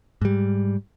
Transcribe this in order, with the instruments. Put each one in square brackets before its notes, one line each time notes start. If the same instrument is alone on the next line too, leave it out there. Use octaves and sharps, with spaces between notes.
[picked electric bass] G#2 G3